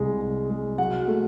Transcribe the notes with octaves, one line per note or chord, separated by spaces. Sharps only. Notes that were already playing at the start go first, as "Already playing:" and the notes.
Already playing: C2 G#3
G#3
G#3
F#3 F#5
A3